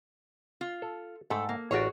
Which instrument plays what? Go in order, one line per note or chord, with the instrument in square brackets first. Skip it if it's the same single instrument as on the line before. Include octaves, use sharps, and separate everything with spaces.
[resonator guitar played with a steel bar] F4
[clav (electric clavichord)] A4
[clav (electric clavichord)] G#2 E5 G5 [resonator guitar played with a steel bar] A3 A4
[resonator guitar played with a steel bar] A#3
[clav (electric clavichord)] A1 A#4 D5 [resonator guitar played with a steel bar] F#4 G#4 C#5